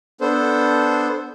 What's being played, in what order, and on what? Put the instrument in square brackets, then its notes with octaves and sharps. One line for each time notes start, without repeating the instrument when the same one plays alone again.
[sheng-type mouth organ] B3 D4 A4 C5